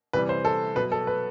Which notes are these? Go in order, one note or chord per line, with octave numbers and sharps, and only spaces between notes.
C3 E3 G3 B4
C5
A4
B2 F#3 B4
A4
B4